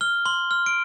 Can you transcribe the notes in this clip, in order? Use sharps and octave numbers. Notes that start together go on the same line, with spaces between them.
F6 G7
C6 G7
F6
D7